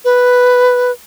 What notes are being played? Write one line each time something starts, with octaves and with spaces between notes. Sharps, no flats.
B4